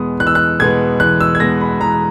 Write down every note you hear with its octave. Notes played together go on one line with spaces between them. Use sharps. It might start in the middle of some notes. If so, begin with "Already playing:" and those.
Already playing: E2 B2 G#3 B3 D#6
E2 F#6
E6
F#6
B2 G#3 B3 G#6
E2 F#6
E6
G#6
B2 G#3 B3 A#6
B5
E2 A#5